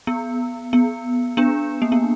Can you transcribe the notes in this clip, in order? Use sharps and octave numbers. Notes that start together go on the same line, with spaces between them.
B3
B3
B3 D4
A#3
B3